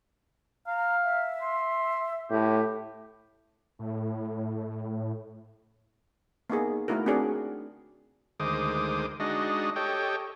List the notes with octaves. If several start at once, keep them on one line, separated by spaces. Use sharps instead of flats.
F5 A#5
E5
C6
A2 G4
A2
A#3 B3 D#4 G#4
A3 D#4 E4 F#4 A#4
C4 D4 F#4 G#4 A#4 D5
D2 D#3 G#3 C5 D6 D#6
G#3 D4 D#4 F#4 D#5
G4 A4 C#5 D#5 G5